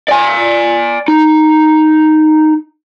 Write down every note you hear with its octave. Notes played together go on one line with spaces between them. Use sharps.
D5 G#5
D#4